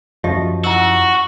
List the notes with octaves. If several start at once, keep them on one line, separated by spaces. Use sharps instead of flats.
F#2 F3 G4 D#5 E5
E4 F#4 F#5 C#6 E6